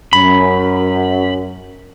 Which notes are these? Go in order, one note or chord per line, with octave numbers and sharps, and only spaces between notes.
F#2 B5